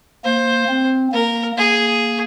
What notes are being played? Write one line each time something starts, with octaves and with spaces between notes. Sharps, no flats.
A#3 C5
C4
A#3 A#4
A#3 G#4